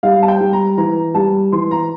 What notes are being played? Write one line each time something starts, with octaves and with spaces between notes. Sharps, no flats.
G3 F5
A5
G5
G3
A#5
E3 A#5
G3 A5
E3 C6
A#5